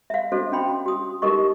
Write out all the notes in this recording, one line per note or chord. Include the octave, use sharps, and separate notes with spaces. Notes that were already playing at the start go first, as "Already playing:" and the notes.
E5 F5
D4 F#4 A4 C5 D#5
C#4 D4 G5 B5 C6
F#4 D#6
D#4 G4 A4 A#4 D#5 C#6